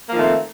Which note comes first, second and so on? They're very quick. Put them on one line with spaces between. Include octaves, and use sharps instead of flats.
A#3 F3 D#3 A3 C4